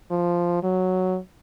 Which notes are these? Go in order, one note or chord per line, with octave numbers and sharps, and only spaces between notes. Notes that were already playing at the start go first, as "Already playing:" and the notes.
F3
F#3